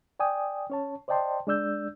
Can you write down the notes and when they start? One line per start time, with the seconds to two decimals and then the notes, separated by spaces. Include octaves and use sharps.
0.20 D5 G5 G#5 D#6
0.70 C#4 C#5 A5
1.08 C5 D5 D#5 G5 A5 C6
1.47 G#3 D4 D5 E6 G6